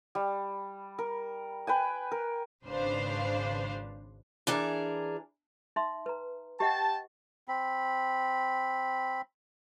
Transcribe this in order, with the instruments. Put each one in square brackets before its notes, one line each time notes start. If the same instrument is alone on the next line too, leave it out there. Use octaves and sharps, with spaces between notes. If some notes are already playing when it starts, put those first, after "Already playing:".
[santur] G3
A#4
B4 G5 G#5
A#4
[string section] G#1 C#3 D4 B4 C5 F5
[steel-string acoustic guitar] E3 D4 G#4 A#4
[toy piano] D#4 E5 C6
B4 A#5
[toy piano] G4 D#5 F#5 [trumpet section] G5 A5
[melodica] C4 B5